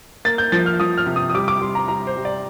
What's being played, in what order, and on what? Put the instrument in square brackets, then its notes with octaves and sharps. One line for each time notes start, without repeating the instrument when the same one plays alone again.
[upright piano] A#3 A6
G6
F3 A6
F6
F3 D#6
F6
C3
D#6
D#6
G3 D6
D6
G3 C6
A#5
G3 A#5
C5
G3
D5